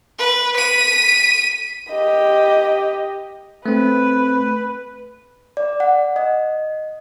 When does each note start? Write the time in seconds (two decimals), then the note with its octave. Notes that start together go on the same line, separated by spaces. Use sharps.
0.18 B4
0.56 B6 D#7
1.91 G4 D#5
3.66 A3 C4 B4
5.57 D5
5.80 F#5
6.16 D#5